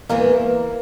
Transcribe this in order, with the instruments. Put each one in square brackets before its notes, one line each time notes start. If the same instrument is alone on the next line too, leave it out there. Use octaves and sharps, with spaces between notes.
[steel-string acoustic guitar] E2 E3 G#3 E4 [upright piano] A#3